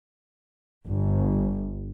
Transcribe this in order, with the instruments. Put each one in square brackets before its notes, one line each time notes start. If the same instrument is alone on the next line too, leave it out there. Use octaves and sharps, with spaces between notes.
[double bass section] G1